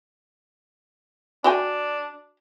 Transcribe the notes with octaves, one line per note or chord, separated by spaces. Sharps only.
D4 F#4 G5 G#5